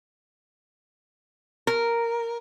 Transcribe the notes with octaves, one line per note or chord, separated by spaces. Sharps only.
A#4